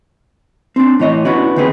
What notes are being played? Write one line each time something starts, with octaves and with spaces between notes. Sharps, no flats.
C4 D4
A2 E3 C#5 D#5
B3 C#4 D4 E4 F#4
D#2 D#3 B3 C4 G#4 B4